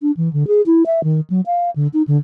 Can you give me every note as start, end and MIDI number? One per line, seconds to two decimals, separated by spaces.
0.02 0.11 62
0.17 0.31 52
0.33 0.47 50
0.47 0.61 68
0.66 0.83 64
0.86 1.03 76
1.04 1.20 51
1.30 1.41 54
1.46 1.70 77
1.76 1.87 50
1.94 2.02 63
2.08 2.17 50